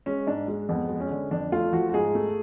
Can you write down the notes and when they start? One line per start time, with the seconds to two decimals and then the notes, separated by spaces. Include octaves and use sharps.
0.06 G#3 C#4
0.27 G#2 D4
0.48 G#3
0.69 F2 B3
0.89 G#3
1.00 C#4
1.10 D3
1.31 F2 D4
1.52 A3 F4
1.73 F3 F#4
1.90 F#4
1.94 G#2 G#4
2.15 A3